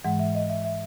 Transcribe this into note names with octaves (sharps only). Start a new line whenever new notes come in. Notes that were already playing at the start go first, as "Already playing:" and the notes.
G#2 E3 G#3 F#5
E5
D#5
E5
E5